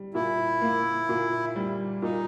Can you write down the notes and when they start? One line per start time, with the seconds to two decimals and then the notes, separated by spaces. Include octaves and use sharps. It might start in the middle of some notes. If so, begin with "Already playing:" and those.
Already playing: G3
0.14 A#2 E4
0.62 A#3
1.09 A#2
1.56 G3
2.02 A#2 D#4